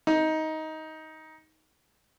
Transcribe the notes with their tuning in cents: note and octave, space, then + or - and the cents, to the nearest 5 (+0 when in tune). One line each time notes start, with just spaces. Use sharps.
D#4 +15